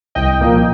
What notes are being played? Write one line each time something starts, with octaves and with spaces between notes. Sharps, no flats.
C2 D#5 G5
A#2 F3 A#3